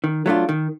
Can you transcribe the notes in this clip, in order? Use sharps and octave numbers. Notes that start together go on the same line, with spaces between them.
D#3
F#3 A3 D4 F4
D#3